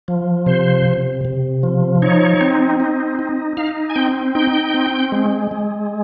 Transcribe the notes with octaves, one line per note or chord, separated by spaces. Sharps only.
F3
C3 C5
C3
C3
F3
D#4 C#5
C4
D#4
D#4
D#4 F5
G#5
C4 G5
D#4 G5
C4
G#3
G#3